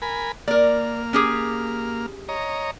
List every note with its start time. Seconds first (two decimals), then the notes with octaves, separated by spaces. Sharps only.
0.02 A#4 G#5 B5
0.48 A#3 A#4 D5 F6
1.13 C#4 G4 G#4
2.29 C#5 D#5 A#5